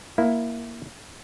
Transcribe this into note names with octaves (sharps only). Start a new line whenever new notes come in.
A#3 E4